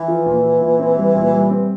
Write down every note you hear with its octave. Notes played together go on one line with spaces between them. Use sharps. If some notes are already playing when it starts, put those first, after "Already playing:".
Already playing: E3
F3
A#2
F4
A#2
C4
G3
A#2
G3
C4